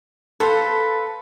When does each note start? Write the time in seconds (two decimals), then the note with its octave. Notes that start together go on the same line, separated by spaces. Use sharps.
0.40 A4 B4 C5 F5